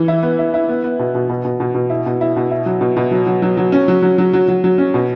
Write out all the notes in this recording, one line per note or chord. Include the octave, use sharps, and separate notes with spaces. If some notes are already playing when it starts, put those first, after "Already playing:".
Already playing: E3
E4
B3
E4
E4
B3
B3
B2
B2
B2
B2
B2
B2
E4
B2
E4
B2
E4
F#3
B2
B2
F#3
F#3
F#3
F#3
C#4
F#3
F#3
F#3
F#3
F#3
F#3
C#4
B2